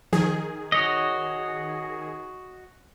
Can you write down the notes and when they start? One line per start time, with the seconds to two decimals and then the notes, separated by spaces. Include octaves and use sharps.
0.13 D#3 F3 G#4
0.72 F#4 C#5 D#5